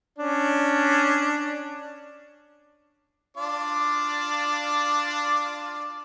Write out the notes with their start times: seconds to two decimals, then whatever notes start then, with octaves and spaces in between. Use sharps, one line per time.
0.18 C#4 D4
3.37 D4 F4 D5